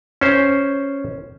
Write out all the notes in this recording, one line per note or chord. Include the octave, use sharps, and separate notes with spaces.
C#4 C5